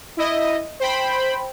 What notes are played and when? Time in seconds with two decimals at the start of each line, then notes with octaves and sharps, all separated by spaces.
0.17 E4 D#5
0.80 C5 G5 B5